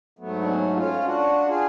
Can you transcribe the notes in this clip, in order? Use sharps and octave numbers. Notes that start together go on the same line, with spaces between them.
G#2 F#3 A3 B3
D4
C#4
C#4 F4
D4 F#4
F4 G#4